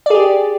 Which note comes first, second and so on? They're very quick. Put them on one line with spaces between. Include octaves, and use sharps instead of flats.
D5 G#4 G4